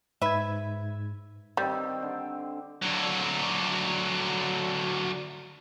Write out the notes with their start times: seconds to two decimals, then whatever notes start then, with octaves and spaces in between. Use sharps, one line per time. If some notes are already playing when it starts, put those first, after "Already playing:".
0.22 G#2 B4 E5 G#6
1.57 D#3 G3 C4 D5
2.02 D3
2.82 D3 F#3